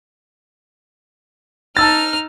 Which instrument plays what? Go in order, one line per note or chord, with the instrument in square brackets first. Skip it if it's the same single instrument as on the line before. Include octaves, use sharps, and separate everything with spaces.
[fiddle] D#4 F6 [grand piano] A5 E6 A6